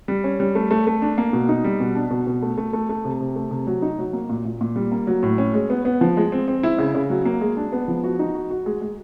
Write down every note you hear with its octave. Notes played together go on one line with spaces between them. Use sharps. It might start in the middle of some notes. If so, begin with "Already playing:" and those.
G3
C#4
G3
A3
A3
A3
D4
A#3
B2
D#4
G3
B2
D4
B2
B2
A3
A3
A3
A3
C3
C3
A3
C3
F#3
D#4
F#3
A#3
A#2
A#2
A#2
G3
A#3
F#3
A2
C#4
G#3
B3
B3
F3
G#3
C4
C4
E4
C#3
C#3
F#3
A#3
G#3
D4
B3
F3
F#4
D#4
F#4
F#4
G#3
G#3